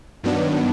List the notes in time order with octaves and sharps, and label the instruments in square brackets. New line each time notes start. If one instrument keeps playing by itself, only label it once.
[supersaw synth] G2 D#3 F#3 B3 D4